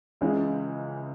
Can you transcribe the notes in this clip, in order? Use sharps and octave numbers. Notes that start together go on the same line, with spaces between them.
C#2 C#3 E3 G#3 E4